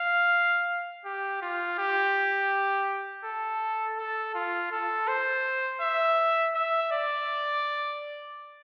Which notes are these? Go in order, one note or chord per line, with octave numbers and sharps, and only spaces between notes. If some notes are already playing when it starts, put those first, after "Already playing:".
Already playing: F5
G4
F4
G4
A4
A4
F4
A4
C5
E5
E5
D5